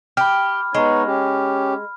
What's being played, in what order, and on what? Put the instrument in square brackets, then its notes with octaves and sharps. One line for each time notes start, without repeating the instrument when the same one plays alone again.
[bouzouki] G4 [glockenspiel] B5 F6
[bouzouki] G#3 [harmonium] B3 D#4 C#5
[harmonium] C#4 G4